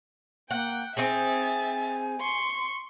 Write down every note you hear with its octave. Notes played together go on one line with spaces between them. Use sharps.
A#3 F#5 G5
C4 D#4 G#4 E5 G#5 A6
C6 C#6